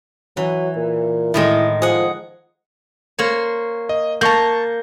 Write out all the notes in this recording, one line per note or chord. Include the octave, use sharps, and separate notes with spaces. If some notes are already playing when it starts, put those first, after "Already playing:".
E3 F#3
A#2
A2 D#3 G#3 E4
F3 G#4 F#5
A#3 C5 C#5
D#5
A#3 A5 A#5 C#6 G6